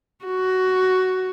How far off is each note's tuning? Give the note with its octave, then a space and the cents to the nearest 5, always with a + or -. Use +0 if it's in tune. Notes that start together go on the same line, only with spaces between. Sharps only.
F#4 +10